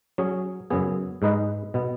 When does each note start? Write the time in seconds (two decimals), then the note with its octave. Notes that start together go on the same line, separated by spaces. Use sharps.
0.18 F#3 C#4 G#4
0.70 F#2 C#3 B3 G#4
1.22 G#2 G#3 D#4 B4 D#5
1.74 B2 B3